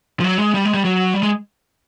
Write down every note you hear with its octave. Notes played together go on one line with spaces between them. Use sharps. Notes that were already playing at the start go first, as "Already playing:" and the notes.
F3
F#3
G#3
G3
G#3
G3
F#3
G3
G#3